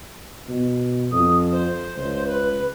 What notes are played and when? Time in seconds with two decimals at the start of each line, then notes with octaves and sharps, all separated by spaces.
0.48 B2
1.12 F2 D#6
1.52 C5
1.97 C#2
2.27 B4